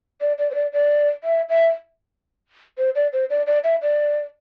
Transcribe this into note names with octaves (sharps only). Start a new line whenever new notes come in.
D5
D5
C5
D5
D5
E5
E5
C5
D5
C5
D5
D5
E5
D5